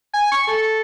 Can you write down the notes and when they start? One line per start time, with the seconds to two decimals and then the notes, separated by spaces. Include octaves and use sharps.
0.14 G#5
0.32 C#6
0.47 A4